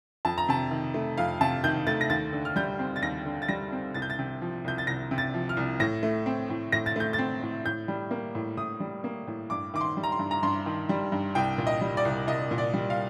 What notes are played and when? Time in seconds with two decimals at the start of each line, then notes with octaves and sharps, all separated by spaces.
0.25 F2 A5
0.38 A#5
0.49 C3 A5
0.71 D#3
0.94 A3
1.18 F2 F5
1.41 C3 A5
1.64 D#3 G6
1.87 A3 A6
2.01 A#6
2.10 D#2 A6
2.33 D3
2.45 F6
2.56 G3 G6
2.79 C4
2.96 A6
3.02 D#2 A#6
3.25 D3
3.42 A6
3.48 G3 A#6
3.72 C4
3.94 C2 A6
4.02 G6
4.10 A6
4.19 C3
4.41 F3
4.64 C2 G6
4.78 A6
4.87 C2 A#6
5.11 C3
5.18 A6
5.34 F3
5.49 F6
5.57 C2
5.80 A2 A#6
6.03 A3
6.26 C4
6.50 A2
6.72 A2 A#6
6.86 A6
6.96 A3 G6
7.13 A6
7.18 C4
7.42 A2
7.65 A2 G6
7.88 G3
8.11 A#3
8.35 A2
8.57 A2 D#6
8.80 G3
9.04 A#3
9.27 A2
9.50 G2 D6
9.74 D#3 D6
9.81 C6
9.97 G3
10.03 A#5
10.12 C6
10.19 G2
10.31 A#5
10.43 G2 C6
10.66 D#3
10.89 G3
11.12 G2
11.35 C2 G5
11.58 A#2
11.67 D#5
11.81 G3
11.97 D5
12.05 C2
12.27 C2 D#5
12.51 A#2
12.58 D5
12.74 G3
12.90 F5